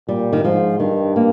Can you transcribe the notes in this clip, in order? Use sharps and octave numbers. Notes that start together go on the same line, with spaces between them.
A#2 G3
D#3
G#2 F3
G2 D#3
A#3